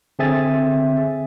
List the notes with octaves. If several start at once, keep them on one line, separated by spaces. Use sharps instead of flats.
D3 C4 G#4 E5 G#5 A6